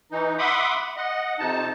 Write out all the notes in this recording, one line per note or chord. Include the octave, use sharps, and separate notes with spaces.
E3 D#4
E5 F#5 B5 C6 D6 D#6
D#5 F#5
F2 C3 D#4 A5